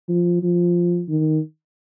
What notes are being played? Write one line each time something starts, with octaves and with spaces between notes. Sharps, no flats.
F3
F3
D#3